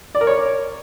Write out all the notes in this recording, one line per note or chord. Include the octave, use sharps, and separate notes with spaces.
D5
A#4
C#5